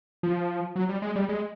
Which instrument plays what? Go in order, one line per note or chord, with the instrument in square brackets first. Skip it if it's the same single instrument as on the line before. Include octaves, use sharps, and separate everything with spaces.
[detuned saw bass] F3
F#3
G3
G#3
G3
G#3